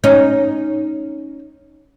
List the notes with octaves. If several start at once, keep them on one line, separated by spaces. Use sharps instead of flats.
C#4 D#4